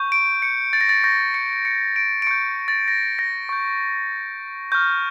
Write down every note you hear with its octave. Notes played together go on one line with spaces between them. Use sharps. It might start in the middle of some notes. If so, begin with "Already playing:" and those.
Already playing: C#6 G6
D7
C#7
A6
A#6
A6
C#6 G6 A#6
C#7
C#7
D7
D7
C#6 G6 C#7
A6
A#6
A#6
C#6 G6
C#6 F6 G6